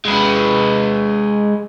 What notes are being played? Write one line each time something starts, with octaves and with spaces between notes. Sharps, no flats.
G#3 B4